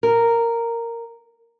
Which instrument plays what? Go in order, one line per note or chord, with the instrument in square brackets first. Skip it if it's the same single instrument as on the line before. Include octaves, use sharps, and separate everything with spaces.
[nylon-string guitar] A#4